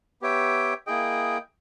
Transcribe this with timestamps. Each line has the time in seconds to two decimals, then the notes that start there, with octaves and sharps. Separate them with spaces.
0.22 B3 G4 C#5 E5 G5
0.87 A#3 E4 G#4 D#5 G5